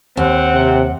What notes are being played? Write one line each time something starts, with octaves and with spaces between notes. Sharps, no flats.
D#2 C4 F#5
C3